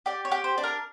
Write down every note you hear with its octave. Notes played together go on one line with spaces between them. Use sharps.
G4 D5
C#5
G4
C5
D4
A#4